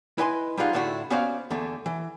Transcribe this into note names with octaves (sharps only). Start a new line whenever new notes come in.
E4 B4 D#5 G#5 A#5 C6
G3 G#3 D4 D#4 F4 F#5
A2 D3 A3 D4 E4 F#4
B3 C#4 F#4 C5 D5 F5
E2 D3 A3
E3